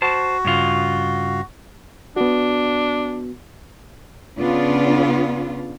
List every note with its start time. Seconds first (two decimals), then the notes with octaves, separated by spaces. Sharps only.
0.02 F#4 C5 A5
0.45 G2 C#3 F4
2.16 B3 D4 F#4
4.39 C#3 B3 D4 F4